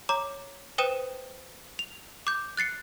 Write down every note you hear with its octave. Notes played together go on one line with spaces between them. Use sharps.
C#5 A#5 D6
B4 C5 G5 D#6 D#7 E7
F7
D6 G6
F#6 A6 C7 C#7